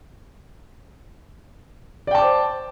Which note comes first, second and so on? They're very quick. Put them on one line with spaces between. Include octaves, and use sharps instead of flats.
D5 G5 A5 D6 C5